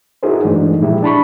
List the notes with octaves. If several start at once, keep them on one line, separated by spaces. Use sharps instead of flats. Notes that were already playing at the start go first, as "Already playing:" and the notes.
D#4 E4 F#4 G#4 A#4 C5
G2 E3 G#3 A3 D4 D#4
A#2 F3 G#3 E4 G4
D4 A5 B5 C#6